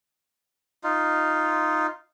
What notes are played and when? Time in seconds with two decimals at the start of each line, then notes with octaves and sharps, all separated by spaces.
0.84 D#4 F4